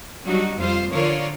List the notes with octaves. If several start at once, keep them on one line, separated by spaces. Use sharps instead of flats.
F#3 G3 D4 D#4 F#4
F2 G3 F4 C5 F5
D3 F3 F4 A#4 C#5 D5